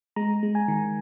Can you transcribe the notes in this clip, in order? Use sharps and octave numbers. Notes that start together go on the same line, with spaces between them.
G#3 A#5
G#3
G#5
D#3